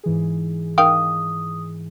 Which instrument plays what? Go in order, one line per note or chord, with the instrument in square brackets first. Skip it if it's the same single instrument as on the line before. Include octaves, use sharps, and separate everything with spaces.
[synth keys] G#2 E3 G#4
[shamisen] D#3 F5 G5 [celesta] D#6